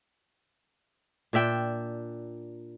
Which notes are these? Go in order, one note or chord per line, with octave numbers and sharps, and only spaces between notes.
A#2 D4 E5 G5